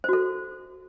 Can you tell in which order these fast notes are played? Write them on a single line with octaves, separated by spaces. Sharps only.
C5 F#4 A4